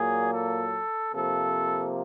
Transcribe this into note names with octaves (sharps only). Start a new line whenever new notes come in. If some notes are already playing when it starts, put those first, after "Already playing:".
Already playing: A#2 F#3 A#3 G#4
A4
C3 F3 A#3 A4